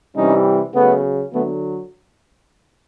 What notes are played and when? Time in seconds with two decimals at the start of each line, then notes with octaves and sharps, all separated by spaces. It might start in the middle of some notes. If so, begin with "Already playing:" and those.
0.16 C3 E3 G3 C#4 D#4
0.74 C#3 F#3 A3 B3
1.33 D3 F#3 A3 B3